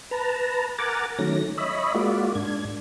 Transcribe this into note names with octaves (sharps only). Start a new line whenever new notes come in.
B4 A5 A#5
A#4 F#5 G#5 A#5 D6 A6
D#3 F#3 A3 C#4 A#6
C#5 D#5 E5 B5
G#3 A#3 F4 F#4 D5
G#2 D4 G#6